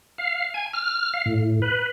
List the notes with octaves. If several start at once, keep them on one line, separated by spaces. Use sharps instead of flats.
F5
G#5
F6
F5
A2
B4